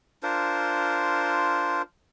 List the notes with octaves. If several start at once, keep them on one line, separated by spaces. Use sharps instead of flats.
D4 F4 A#4 C5